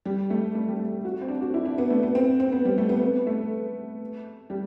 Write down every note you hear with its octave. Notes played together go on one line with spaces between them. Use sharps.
G3
A3
A3
G3
A3
F#4
C4
D4
F#4
E4
D4
B3
A3
B3
C4
C4
B3
G3
A3
B3
B3
A3
G3